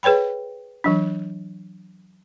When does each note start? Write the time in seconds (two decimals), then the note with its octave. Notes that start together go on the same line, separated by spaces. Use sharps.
0.03 G#4 B4 C#5 G5 B5
0.84 E3 F#3 D4